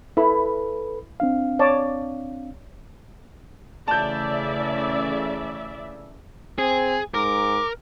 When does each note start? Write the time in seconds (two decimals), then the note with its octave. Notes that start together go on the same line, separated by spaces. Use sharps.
0.17 E4 A4 B4 B5
1.20 C4 D4 F5
1.59 C#5 D5 A5
3.88 C#3 E3 A3 D5 E5 A5 G6
6.58 C4 G#4 G#5
7.14 G#2 A#4 D6